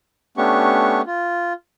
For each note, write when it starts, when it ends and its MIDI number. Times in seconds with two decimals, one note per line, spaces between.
0.37 1.01 57
0.37 1.01 59
0.37 1.01 61
0.37 1.01 62
0.37 1.01 67
0.37 1.01 85
1.07 1.53 65